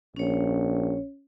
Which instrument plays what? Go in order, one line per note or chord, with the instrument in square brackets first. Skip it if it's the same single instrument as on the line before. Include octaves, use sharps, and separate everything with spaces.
[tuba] A#1 [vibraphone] C#4 C#5